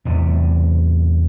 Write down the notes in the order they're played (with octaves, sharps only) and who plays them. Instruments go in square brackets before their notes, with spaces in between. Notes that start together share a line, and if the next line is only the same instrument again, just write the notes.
[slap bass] E2 A2 C3